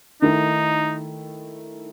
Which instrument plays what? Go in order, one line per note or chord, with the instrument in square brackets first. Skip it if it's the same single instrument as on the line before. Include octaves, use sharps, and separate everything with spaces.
[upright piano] D#3 A3 E4 A4 [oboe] D#4